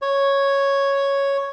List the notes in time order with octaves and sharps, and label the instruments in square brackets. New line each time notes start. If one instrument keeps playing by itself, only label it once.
[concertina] C#5